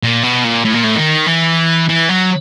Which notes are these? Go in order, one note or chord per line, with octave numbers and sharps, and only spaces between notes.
A#2
B2
A#2
A2
A#2
A2
D#3
E3
E3
F#3